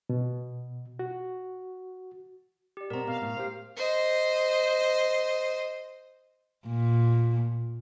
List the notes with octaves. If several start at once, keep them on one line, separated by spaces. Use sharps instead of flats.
B2
F#4
G4 D5
B2 C4 A#4 A#5
B2 F5
A2 F5
G4 C5
C5 D#5
A#2